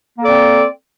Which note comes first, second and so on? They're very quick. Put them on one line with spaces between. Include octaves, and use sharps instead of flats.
A#3 A4 D5 C4